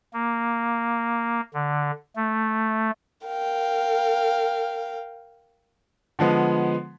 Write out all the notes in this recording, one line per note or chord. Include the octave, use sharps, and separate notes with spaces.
A#3
D3
A3
A#4 F5 G5
D3 F3 G#3 B3